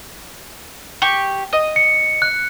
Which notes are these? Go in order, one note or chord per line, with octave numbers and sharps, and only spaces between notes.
G4 C#6 G7
D#5
C#7
F#6